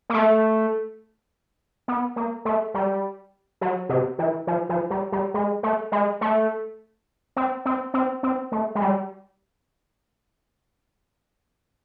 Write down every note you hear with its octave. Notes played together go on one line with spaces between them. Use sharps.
A#3
A3
B3
A#3
A3
G3
F#3
C3
E3
F3
F3
G3
G3
G#3
A3
G#3
A3
C4
C4
C4
C4
A3
G#3
G3